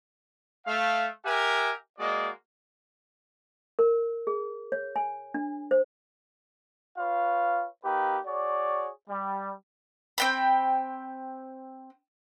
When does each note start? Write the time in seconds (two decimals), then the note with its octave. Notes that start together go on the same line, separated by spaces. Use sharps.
0.66 A3 F5
1.24 G4 A#4 E5 F#5 G#5
1.98 G#3 A#3 F#4 D5 D#5
3.79 A#4
4.27 G#4
4.72 C#5
4.96 G#5
5.34 D4
5.71 C5
6.98 F4 B4 C#5 F5
7.84 A#3 D#4 G4 B4 G5
8.26 F#4 G#4 C#5 D5
9.10 G3
10.18 C4 G5 B5